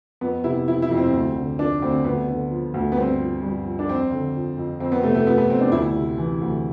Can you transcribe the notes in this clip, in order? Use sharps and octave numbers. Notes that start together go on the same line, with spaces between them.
F2 B3
C3 E4
F3 E4
E4
F2
C4
D2
D3
F3 D4
D2 C4
D2 B3
D3
F3
D2
B3
G2 C4
F3
G2
F3
D4
F2 C4
D3
F3
F2
F2 C4
B3
C3 A3
A3
F3 B3
B3
F2 C4
D4
D2 E4
C3
E3
D2